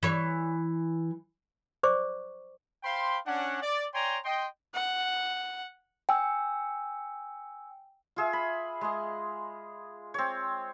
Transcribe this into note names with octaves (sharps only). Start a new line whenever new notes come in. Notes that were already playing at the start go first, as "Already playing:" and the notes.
E3 C#5
C5 D5 C#6 D6
C5 F5 G5 B5 C6
C#4 D4 F#5
D5
C#5 D5 G5 G#5 A#5 C6
D#5 G5 C6
F#5
G5 G#5 E6
F4 G#4 E5
B5
G#3 D#5
C4 C#5